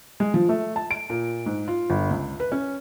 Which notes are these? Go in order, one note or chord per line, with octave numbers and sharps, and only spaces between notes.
G#3
F3
A3
A5
D7
A#2
G#2
F4
G1
C#2
B4
C#4